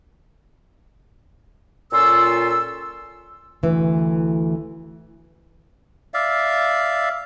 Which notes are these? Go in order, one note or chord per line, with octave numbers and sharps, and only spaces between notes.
A#2 C#4 F4 A4 C6 E6
D2 E3
D5 E5 F5